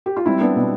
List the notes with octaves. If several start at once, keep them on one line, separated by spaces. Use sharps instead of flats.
G4
F4
G3 C4 E4
B3 D4
B2 B3